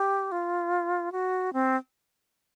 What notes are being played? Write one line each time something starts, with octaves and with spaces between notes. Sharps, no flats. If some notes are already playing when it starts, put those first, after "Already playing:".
Already playing: G4
F4
F#4
C4